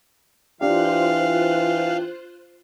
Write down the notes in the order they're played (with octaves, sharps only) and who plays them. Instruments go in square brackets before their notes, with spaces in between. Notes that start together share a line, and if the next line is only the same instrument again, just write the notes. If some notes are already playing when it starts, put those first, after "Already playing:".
[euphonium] E3 [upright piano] D4 G4 [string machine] F4 C5 F#6 [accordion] F5